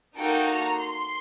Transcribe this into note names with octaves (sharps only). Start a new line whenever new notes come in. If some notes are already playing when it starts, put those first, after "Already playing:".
A#3 D#4 F#4 A4 G5
A#5
C6